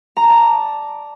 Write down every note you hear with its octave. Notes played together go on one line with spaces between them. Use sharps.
A#5
A5
D5